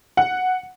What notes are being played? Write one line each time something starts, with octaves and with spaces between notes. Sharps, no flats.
F#5